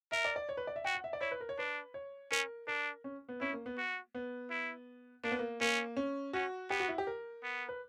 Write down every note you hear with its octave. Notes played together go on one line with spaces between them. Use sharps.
A#4 E5
D5
D5
C#5
B4
D5
E5
F#4 G5
F#5
E5
D5
E4 C#5
B4
A#4
C#5
D4 B4
C#5
C#4 A#4
D4 A#4
C#4
B3
C#4 E4
A#3
B3
F#4
B3
E4
A#3 D4
B3
A#3
A#3 C#4
C#4
C#4 F#4
B3 G4
F#4
E4
G4
A#4
B3
B4